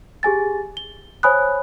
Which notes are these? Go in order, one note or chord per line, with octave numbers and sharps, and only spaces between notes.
G4 G#4 G#5 A6
G7
C5 C#5 G#5 B5 D#6 F#6